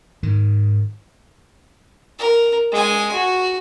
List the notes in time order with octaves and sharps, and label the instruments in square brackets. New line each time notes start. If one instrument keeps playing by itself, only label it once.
[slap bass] G#2 D#3
[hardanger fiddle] A#4
G#3 G#5
F#4